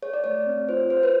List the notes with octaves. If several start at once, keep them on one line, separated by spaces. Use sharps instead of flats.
G#4 C#5
D5
A3 C#5
C4
F4 C5
G#4 C5
B4